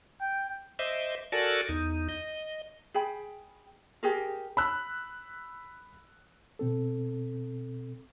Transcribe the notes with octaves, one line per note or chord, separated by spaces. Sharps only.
G5
C5 D#5 E5 D6
F#4 A4 A#4 D5 G#5 A5
E2 D#4
D#5
G#4 G5 B5
G4 G#4 A#4
B5 E6 F#6
B2 C4 A4